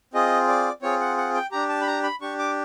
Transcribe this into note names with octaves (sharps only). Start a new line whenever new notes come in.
C4 F4 G#4 D#5
D5
C4 F4 G#4 C#5
F#5
F#5
G5
D4 G4 A#5
A5
B5
A#5
B5
D4 G4 C#6
D6